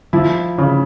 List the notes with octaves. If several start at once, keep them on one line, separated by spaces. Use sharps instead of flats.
F3 E4
C#3